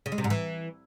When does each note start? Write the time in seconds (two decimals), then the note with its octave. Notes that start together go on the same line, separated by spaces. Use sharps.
0.06 C#3
0.12 G#3
0.18 C3
0.24 G#2
0.30 E3